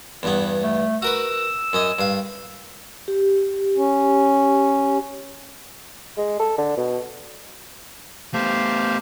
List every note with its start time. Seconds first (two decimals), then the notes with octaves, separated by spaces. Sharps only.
0.23 E2 G2 B3
0.63 A3
1.02 F#4 A#4 B4 E6
1.73 F#2 C#4 D#5
1.99 G2 F5
3.08 G4
3.77 C#4
6.17 G#3
6.40 A4
6.58 D3
6.77 B2
8.34 A3 B3 G4 C5 F5